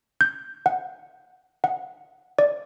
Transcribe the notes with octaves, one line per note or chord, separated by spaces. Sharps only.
G6
F#5
F#5
D5